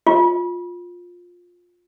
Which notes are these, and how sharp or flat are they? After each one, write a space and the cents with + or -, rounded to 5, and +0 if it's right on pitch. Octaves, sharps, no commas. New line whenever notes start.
F4 +15